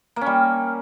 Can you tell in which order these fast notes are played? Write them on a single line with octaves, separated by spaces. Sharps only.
A#3 C#4 G3